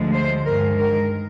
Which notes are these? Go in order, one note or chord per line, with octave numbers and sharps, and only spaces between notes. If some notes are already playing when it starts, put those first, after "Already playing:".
Already playing: D2 D3 F3 G#3
C5
G2 D#3 G#3 A#4
A#4